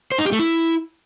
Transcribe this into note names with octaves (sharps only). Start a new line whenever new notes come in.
C5
D#4
G4
A3
E4